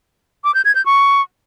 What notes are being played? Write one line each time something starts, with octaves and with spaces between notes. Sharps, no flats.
D6
G6
G#6
G6
C#6